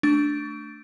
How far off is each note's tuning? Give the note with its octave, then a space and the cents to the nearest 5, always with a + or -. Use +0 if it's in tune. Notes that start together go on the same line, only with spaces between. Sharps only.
A3 +0 D4 +0 C#6 +30